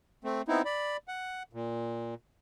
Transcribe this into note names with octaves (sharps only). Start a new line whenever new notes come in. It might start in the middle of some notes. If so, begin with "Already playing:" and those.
A3 C4
B3 C4 D#4 E4
D5 B5
F#5
A#2